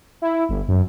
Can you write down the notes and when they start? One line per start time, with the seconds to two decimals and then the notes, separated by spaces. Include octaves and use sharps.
0.22 E4
0.49 G1
0.68 F#2